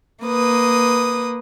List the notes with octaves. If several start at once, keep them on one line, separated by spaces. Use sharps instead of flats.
A#3 B4 D#6